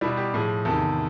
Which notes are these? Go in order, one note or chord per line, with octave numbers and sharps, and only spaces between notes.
B2 G3 E4
G4
A2 F3 G#4
E2 C3 D#3 A4